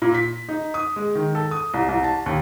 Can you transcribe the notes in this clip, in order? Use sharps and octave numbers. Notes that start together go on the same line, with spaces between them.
A#2
B6
D#4
D#6
G#3
D#3
A4
D#6
C2
C2
A5
D#2